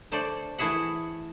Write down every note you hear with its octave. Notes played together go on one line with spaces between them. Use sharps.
D3 A3 A4 C5 D5
E3 A3 E4 G#4 E5 F#5